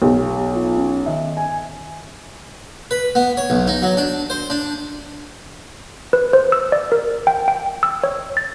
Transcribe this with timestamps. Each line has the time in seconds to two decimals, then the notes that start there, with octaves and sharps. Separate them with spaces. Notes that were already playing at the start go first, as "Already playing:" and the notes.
0.02 B1 G4
0.56 F4
0.78 C#4
1.06 D#3 D#5 E5
1.37 G#5
2.91 B4
3.15 B3
3.37 C#5
3.50 B1
3.68 D#4
3.82 F#3
3.97 D4
4.30 C5
4.50 D4
6.13 B4
6.33 C5
6.52 E6
6.72 D5
6.92 A#4
7.27 G5
7.48 G5
7.83 E6
8.04 C#5
8.37 A6